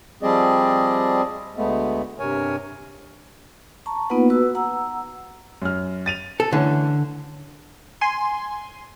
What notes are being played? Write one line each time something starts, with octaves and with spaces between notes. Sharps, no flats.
F3 G3 C4 G#4 D5 D#5
D2 G#3 A3 B3
G2 C3 A#4 C#5 G#5
A5 A#5 C#6
A#3 B3 D#4 F4 B4 F#5
F#4 B4 E6
F#5 A#5 E6
F#2 F6
A6 D#7 F7
A4
D3 E3 A3 C#4
G#5 C6